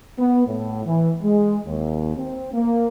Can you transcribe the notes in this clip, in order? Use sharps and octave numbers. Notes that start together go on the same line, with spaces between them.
B3
A2
E3
G#3
D#2
C4
A#3